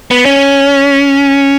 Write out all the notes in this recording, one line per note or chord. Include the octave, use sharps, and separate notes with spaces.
B3
C#4